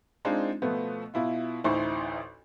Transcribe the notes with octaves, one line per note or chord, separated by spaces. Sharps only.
G#3 C4 D4 D#4 F4
B2 F3 A3 B3
B2 E4 F4
A1 D2 D#4 E4 C5 C#6